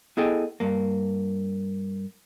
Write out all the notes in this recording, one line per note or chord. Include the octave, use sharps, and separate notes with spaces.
B3 E4 G#4 A4 D#5 G5
G2 A#3